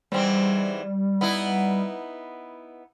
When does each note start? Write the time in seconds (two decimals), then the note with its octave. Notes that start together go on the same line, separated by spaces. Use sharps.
0.12 G#2 E3 G3 C4
1.21 B3 D#4 E4